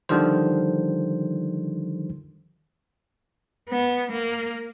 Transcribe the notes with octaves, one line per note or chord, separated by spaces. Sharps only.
D3 D#3 F3 G3 C5
B3
A#3